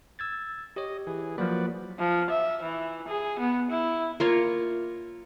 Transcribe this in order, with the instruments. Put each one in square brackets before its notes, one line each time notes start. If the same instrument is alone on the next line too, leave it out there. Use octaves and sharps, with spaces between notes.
[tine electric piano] E6 G#6 A6
[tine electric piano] G4 C#5 [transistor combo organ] D#5
[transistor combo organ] E3 G#4
[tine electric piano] F3 F#3 A#3 [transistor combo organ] F#4 B4 D5
[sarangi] F3
E5
E3
G#4
B3
E4
[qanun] A#3 F4 C#5